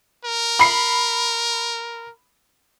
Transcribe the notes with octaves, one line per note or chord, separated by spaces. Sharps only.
A#4
B5 C7